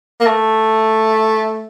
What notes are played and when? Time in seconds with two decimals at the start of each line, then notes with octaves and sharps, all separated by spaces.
0.20 A#3
0.26 A3